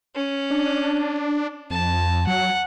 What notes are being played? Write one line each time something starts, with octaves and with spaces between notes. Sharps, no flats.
C#4
D4
F2 A5
F#3 F#5